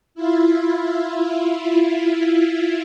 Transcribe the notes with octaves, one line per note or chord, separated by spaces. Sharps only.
E4 F4